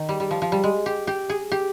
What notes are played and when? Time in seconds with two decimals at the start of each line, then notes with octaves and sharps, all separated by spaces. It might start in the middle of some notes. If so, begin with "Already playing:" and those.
Already playing: D#3
0.09 G3
0.20 G3
0.31 F3
0.42 F3
0.52 G3
0.64 G#3
0.86 G4
1.07 G4
1.29 G#4
1.52 G4